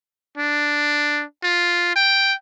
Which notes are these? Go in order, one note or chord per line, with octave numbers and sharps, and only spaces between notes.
D4
F4
G5